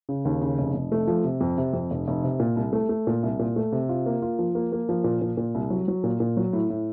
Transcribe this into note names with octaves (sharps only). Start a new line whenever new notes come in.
C#3
D#2
C#3
F1
F1
A3
F3
C3
F2
C3
F2
F1
F1
C3
A#2
C2
A3
A3
A#2
C2
A#2
A3
C3
F4
A#3
F4
F3
A#3
A#3
F3
A#2
A#2
A#2
C2
F#3
F#3
A#2
A#2
F#3
A2
A2